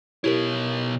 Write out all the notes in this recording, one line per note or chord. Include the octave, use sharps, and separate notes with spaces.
B2 E4 G4 A#4 C#5